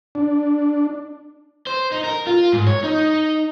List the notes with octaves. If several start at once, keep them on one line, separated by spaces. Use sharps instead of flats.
D4
C5
D#4
A#4
F4
G#2
C#5
D#4